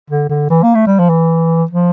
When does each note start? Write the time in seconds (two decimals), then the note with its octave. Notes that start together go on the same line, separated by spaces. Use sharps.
0.10 D3
0.29 D3
0.50 E3
0.63 A#3
0.75 A3
0.87 G3
0.99 F3
1.10 E3
1.71 F3